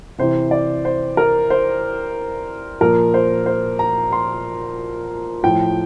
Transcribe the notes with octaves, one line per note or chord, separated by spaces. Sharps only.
C3 E3 C5
D5
C5
A#4
C5
A#2 F3 A#4
C5
C5
A#5
C6
A2 F3 G5